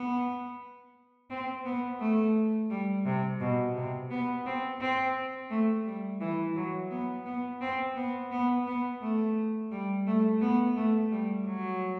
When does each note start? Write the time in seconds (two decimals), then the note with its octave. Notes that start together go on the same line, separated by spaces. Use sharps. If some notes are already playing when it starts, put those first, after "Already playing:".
Already playing: B3
1.30 C4
1.65 B3
2.00 A3
2.71 G3
3.06 C3
3.40 B2
3.75 C3
4.11 B3
4.46 C4
4.81 C4
5.51 A3
5.86 G3
6.21 E3
6.56 F#3
6.91 B3
7.25 B3
7.61 C4
7.96 B3
8.31 B3
8.67 B3
9.01 A3
9.71 G3
10.07 A3
10.41 B3
10.76 A3
11.11 G3
11.47 F#3